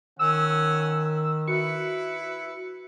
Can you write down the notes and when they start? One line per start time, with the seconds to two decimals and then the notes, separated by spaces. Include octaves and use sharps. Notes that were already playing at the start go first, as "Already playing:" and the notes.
0.19 D#3 C#4 F#5 E6
1.48 E4 F#4 B4 C#7